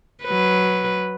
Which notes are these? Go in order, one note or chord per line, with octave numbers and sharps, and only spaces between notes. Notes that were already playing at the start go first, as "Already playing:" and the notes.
F#3 B4